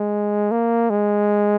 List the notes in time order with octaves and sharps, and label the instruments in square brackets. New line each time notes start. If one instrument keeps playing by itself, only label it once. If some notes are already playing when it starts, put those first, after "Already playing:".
Already playing: [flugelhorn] G#3
A#3
G#3